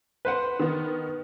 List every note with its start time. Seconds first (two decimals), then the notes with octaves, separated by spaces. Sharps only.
0.25 B4 C5 F#5
0.59 D#3 B3